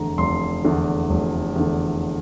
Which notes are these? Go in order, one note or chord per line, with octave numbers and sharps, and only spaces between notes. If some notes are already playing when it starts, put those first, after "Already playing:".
Already playing: F1 E2 D3 A#5
F1 C6
E2 D3
F1
E2 D3